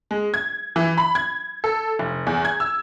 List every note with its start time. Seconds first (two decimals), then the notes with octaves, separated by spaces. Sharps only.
0.11 G#3
0.34 G#6
0.76 E3
0.98 B5
1.15 G#6
1.64 A4
1.99 F1
2.27 E2
2.45 G#6
2.60 E6